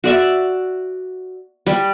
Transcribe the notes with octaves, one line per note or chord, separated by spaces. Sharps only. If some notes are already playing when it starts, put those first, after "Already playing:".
F#4 D5 E5
G3